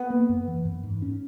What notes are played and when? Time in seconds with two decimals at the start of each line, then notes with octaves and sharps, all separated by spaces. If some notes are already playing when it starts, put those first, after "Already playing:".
Already playing: B3
0.10 A#3
0.29 F#2
0.48 E3
0.65 F#2
0.83 G#2
1.02 C#4